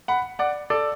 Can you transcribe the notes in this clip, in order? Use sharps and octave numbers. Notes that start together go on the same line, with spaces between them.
F#5 B5
D5 F#5
A4 D5